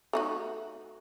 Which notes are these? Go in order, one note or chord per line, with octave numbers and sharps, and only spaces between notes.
A3 D#4 F#4